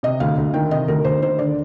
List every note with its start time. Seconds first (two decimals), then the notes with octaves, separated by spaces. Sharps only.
0.03 C3 D#5
0.20 D2 F5
0.37 D2
0.54 D#3 G5
0.71 C3 D#5
0.88 D2 A#4
1.04 D2 C5
1.22 D#3 C5
1.38 D3 D5